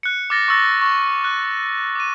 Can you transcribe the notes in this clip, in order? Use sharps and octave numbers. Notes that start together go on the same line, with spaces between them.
F#6 C#7
D6 F6 A6 A#6 C#7
C#6 D6 E6 A6 A#6
C#6
F#6
D6 D#7